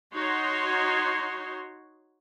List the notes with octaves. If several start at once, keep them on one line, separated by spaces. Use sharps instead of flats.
D#4 F#4 C#5 C6